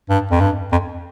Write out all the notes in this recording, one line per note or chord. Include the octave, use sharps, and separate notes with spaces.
G2
F2
G2
F2